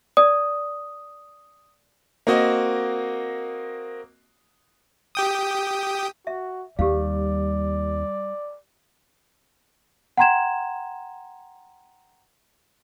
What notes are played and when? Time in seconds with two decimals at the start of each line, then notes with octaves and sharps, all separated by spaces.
0.17 D5 D#6
2.27 A#3 C4 F#4 D#5
5.15 G4 G5 D#6
6.27 F#4 E5
6.79 D#2 G3 G4 D5 F5
10.17 F#5 G5 A#5 C6 G#6 E7